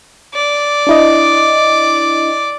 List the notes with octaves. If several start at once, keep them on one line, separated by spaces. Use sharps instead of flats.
D5
D4 E4 D#5